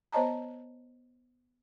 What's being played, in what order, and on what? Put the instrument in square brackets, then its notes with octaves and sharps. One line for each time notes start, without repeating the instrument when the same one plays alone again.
[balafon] B3 C5 C#5 D#5 A5 A#5